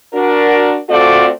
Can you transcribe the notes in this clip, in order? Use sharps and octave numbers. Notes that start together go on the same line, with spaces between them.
D4 F#4 A#4
A3 C4 F4 F#4 A4 D5